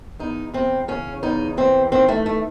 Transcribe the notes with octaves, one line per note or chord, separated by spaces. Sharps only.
E2 D#4
E2 C4
C#3 C#4
E2 D#4
E3 C4
D#3 C4
A3
A3